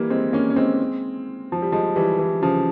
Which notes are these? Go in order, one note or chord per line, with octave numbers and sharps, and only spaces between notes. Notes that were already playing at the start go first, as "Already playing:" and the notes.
Already playing: E3 G3 A#3
G#3 C4
A#3 C#4
C#4
G#3 C4
F3
G3
F3 G#3
E3 G3
E3 G3
C#3 F3